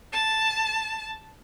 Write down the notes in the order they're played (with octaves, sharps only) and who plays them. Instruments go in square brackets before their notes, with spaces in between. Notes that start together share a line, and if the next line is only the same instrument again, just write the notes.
[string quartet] A5